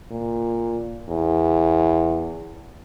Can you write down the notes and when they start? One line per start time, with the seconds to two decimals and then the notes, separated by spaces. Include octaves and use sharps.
0.11 A#2
1.09 E2